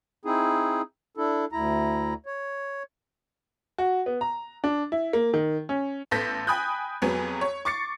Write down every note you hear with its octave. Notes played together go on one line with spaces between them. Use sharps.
C4 D#4 E4 G#4
D4 E4 A4
D2 E4 A#5
C#5
F#4
B3
A#5
D4
E4
A#3
D#3
C#4
A1 B3 A4 G6 A#6 B6
G5 G#5 B5 D#6 F#6 G6
F2 F#3 B3 G#4
C#5
C#6 D6 A6 C7 C#7